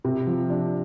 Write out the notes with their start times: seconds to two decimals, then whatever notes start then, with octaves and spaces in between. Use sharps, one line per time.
0.04 C3
0.27 F3
0.50 D4